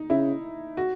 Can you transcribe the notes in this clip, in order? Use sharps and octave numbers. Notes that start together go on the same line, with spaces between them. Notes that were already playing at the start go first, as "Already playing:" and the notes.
Already playing: D#4
C#3 E4
F#4